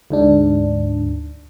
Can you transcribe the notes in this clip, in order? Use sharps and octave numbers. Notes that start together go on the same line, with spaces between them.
D2 G#2 D4